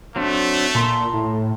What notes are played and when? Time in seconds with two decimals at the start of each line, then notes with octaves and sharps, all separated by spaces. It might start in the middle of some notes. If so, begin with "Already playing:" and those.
0.16 F#3 A3 C4 D4
0.75 A#2 A5 A#5 C6
1.13 A2